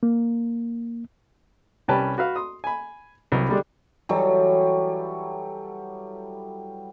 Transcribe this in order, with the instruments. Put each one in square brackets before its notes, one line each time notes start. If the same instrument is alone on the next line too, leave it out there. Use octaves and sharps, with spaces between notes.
[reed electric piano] A#3
[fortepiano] C2 G3 C#4 B4 G5 A5
F#4 B4 F5
C6 D#6
G#5 B5
C2 F#3 B4
D3 G3 G#3 D4
[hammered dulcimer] E3 F#3 G3 A4